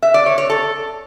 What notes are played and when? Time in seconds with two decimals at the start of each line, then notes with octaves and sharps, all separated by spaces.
0.03 E5
0.14 D5
0.26 C#5
0.38 C#5
0.50 A4